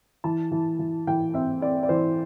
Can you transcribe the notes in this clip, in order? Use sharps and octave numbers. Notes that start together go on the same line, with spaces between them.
E3 A5
E3
E3
E3 G5
C4 E5
C4 D5
D5
E3 C5